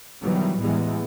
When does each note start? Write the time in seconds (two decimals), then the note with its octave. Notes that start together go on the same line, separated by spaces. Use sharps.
0.22 B2 D#3 E3 F#3 G3 B3
0.60 E2 A2 E3 G3 G#3 B3